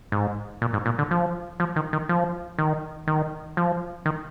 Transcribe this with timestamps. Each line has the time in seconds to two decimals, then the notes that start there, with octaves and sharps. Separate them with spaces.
0.12 G#2
0.62 A#2
0.73 G#2
0.86 A#2
0.98 D3
1.11 F3
1.60 F3
1.76 D#3
1.93 D#3
2.09 F3
2.58 D#3
3.07 D#3
3.57 F3
4.05 D#3